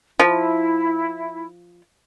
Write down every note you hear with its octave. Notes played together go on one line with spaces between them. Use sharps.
F3 E4